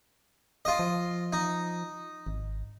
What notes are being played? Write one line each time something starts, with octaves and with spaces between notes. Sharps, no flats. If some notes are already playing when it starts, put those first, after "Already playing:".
F4 D#5
F3
D#4
G#1